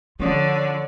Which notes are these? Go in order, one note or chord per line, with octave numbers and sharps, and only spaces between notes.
D3 F3 C#5 D5